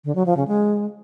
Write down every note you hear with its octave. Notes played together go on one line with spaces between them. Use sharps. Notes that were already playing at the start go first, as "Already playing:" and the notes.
D3
F#3
F3
C#3
G#3